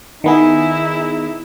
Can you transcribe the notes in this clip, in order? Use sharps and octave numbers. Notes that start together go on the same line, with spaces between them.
D#3 B3 D#4 E4 G#4